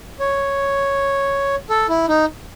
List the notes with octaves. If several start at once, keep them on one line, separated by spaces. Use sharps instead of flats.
C#5
A4
E4
D#4